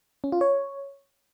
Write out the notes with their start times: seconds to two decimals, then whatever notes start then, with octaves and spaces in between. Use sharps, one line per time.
0.24 C#4
0.32 F4
0.41 C#5